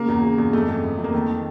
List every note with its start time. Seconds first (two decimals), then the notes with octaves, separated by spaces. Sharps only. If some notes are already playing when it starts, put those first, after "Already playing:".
Already playing: C#3 A#3
0.08 E2
0.23 C#3
0.38 E2
0.53 F2 A3
0.68 F2
0.84 F2
0.98 F2
1.04 A#3
1.14 D#3 A3
1.29 D#3